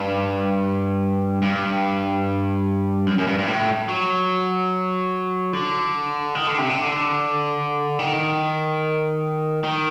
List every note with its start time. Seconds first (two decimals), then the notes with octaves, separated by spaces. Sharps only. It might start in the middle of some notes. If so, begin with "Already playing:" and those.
Already playing: G2
1.42 G2
3.07 F#2
3.18 F#2
3.27 G2
3.39 G2
3.47 A2
3.88 F#3
5.53 D3
6.35 D#3
6.47 D3
6.58 C3
6.70 D3
7.99 D#3
9.63 D#3